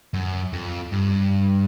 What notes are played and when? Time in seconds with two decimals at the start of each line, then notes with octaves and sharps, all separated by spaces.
0.14 F#2
0.53 F2
0.92 G2